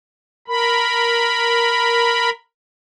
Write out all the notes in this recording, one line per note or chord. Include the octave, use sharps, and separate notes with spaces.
A#4 B5